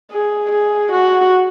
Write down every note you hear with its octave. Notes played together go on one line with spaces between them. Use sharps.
G#4
G#4
F#4